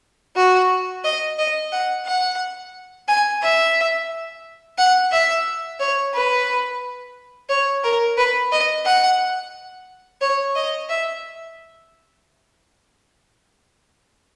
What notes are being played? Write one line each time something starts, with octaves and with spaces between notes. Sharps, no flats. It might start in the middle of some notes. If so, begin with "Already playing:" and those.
F#4
D#5
D#5
F#5
F#5
G#5
E5
F#5
E5
C#5
B4
C#5
A#4
B4
D#5
F#5
C#5
D#5
E5